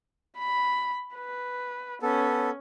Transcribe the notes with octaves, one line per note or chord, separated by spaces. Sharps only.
B5
B4
B3 C#4 A4